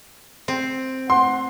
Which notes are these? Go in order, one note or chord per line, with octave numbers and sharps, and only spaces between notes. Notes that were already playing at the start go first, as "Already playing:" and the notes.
C4
F#5 C6